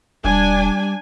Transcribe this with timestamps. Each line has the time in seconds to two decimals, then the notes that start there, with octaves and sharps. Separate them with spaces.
0.25 E1 G3 D4 G#5